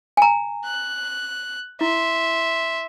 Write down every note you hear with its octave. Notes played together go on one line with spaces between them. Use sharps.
G#5 A#5
F#6
E4 E5 C6